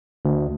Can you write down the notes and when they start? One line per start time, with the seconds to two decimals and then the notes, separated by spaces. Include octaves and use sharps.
0.25 D2